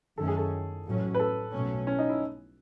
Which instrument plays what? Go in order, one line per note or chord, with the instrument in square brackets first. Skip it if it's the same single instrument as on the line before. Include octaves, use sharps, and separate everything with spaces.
[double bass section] F#2 D#3 A3 C#4 [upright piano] A4
[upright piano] G#4
A4
[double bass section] A1 A2 F#3 C#4
[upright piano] B4
A4
[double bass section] B1 B2 F#3 A3 C#4
[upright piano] C#4
D#4
E4